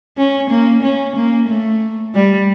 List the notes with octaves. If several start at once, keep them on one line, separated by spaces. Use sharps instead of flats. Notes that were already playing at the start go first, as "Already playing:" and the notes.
C#4
A#3
C#4
A#3
A3
G3